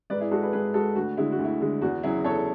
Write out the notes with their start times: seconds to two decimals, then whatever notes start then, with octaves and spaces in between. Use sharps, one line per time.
0.10 G#2 B4 D5
0.20 E4 G#4
0.31 G#3 F#4 A4
0.42 G#4 B4
0.53 G#2 G#4 B4
0.74 G#3 F#4 A4
0.96 D2 F#4
1.17 D3 G#3 E4
1.32 F#4
1.38 D2
1.45 E4
1.60 D3 G#3
1.82 E2 F#4
2.03 C#3 F#3 E4 G#4
2.24 E2 A4 C#5